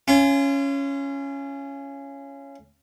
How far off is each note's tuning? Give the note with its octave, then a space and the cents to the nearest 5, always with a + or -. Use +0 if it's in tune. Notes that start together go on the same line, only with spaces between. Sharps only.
C#4 +0 F4 -35